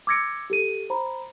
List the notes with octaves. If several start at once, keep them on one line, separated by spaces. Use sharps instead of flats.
D6 E6 G#6 A#6 C#7 D7
G4 A4 D#7
C5 A#5 B5